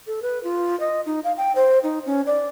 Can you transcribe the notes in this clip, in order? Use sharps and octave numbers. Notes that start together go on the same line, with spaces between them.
A4
B4
F4
D#5
D#4
F5
G5
C5
D#4
C#4
D5